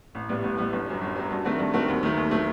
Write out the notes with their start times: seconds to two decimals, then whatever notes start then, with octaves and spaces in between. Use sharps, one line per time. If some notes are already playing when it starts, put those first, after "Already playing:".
0.15 A1
0.29 A2 G3 B3
0.44 A1
0.57 A2 G3 B3
0.73 G1
0.87 F#2 F#3
1.01 G1
1.16 F#2 F#3
1.31 G2
1.45 D#3 A3 C4 F#4
1.59 G2
1.73 D#3 A3 C4 F#4
1.88 D#2
2.03 D#3 F#3 A3
2.17 D#2
2.31 D#3 F#3 A3